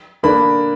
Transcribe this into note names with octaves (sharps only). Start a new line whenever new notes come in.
D3 A#3 D4 B5